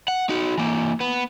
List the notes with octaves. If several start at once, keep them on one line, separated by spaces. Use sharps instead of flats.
F#5
D#4 F#4
E3 A#3
B3